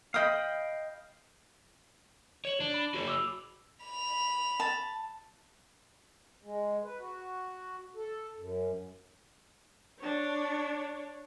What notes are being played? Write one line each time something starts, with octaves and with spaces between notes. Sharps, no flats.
D#5 F5 G5 B5 D#6
C#5 E7 F#7
D4
B5
F#4 G#4 C#5
D6 E6 F7
B5 F7
A5
G#3
B4
F#4
A4
F#2
D4 C#5